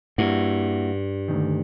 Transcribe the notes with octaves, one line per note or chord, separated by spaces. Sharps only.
G2 A#3 E4 F#4
D2 G#2 D#3